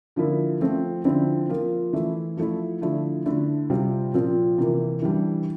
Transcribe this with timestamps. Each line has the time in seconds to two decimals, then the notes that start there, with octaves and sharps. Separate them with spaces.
0.16 D3 F3 A#3 E4
0.60 F3 A3 C4
1.04 D3 F3 C4 E4
1.49 F3 A#3 F4
1.93 E3 A3 E4
2.37 F3 A3 E4
2.81 D3 F3 A3 E4
3.26 D3 A3 E4
3.70 C3 G3 C4 F4
4.14 A#2 F3 C4 F4
4.58 C3 E3 A#3
5.02 E3 G3 D4